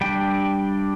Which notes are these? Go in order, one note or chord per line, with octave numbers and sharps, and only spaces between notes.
G3 D4 G5